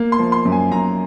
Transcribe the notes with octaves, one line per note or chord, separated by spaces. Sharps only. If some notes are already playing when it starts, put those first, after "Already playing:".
Already playing: A#3
C6
F3
C6
F#2
G#5
F#2 A#5